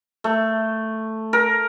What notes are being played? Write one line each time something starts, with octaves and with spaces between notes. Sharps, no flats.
A3
A#4